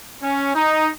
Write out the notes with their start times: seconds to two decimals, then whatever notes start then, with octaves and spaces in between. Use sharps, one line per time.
0.22 C#4
0.55 D#4